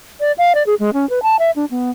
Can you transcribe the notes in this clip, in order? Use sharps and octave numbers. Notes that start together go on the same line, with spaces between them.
D5
F5
D5
G#4
G#3
C#4
B4
A5
E5
D4
B3